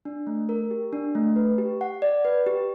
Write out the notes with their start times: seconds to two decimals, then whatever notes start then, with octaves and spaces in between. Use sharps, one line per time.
0.05 D4
0.27 A3
0.49 A#4
0.71 G4
0.93 D4
1.15 A3
1.36 B4
1.58 G4
1.81 F#5
2.02 D5
2.25 B4
2.47 G4